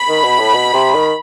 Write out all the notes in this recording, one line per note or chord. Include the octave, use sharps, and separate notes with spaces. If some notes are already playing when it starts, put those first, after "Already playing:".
Already playing: B5
D#3
B2
A2
B2
C3
D#3